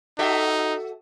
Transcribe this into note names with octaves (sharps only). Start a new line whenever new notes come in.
D#4 F#4 A4 E5